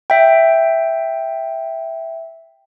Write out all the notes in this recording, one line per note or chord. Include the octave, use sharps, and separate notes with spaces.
E5 G5